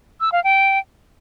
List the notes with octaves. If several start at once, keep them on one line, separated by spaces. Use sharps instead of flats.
E6
F5
G5